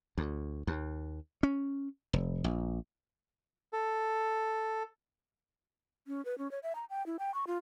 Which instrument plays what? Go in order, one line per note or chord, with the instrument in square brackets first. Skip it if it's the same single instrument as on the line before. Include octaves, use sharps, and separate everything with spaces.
[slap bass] D2
D#2
C#4
F1
A#1
[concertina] A4
[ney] C#4
B4
C#4
C#5
E5
A#5
G5
E4
G5
C#6
F4